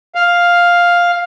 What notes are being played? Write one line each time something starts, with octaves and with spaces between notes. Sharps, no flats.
F5